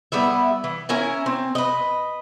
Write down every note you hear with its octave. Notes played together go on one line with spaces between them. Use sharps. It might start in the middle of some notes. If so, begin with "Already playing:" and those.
G3 B3 E4 E5
E3
C#4 E4 A#4 G#5
C4
B4 D#5